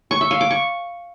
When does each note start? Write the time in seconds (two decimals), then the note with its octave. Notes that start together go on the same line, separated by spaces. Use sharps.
0.11 C#6
0.21 E5
0.31 F5
0.41 D6
0.51 C#6